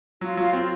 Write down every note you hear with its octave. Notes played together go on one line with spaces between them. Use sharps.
F#3 F4
F#3 F4
C4 F4